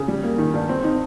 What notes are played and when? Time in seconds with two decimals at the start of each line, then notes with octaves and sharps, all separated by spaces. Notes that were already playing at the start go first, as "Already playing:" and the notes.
Already playing: C#3
0.08 G3
0.23 A#3
0.38 D#3
0.54 G2
0.69 C4
0.84 D#4